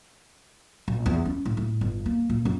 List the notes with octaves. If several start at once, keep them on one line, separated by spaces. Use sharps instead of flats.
A#1
E2
C#4
A2
A2
G1
A#3
A#2
F#2